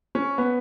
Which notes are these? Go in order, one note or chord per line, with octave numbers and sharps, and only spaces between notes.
C#4
B3